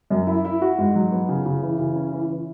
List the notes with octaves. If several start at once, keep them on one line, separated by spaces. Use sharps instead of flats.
F#2
E4
E4
F#4
G#2
F#3
B3
C#3
C#3
E3
C#3
C#4
E3
E3